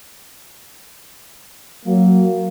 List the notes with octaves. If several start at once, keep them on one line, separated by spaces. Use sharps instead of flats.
F#3 A#3